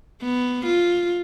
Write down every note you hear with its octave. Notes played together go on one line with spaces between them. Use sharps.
B3
F4